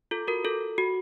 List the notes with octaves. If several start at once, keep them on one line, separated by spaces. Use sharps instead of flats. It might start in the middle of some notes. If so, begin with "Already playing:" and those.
F4 A4
F#4 A#4
F4 A4
F#4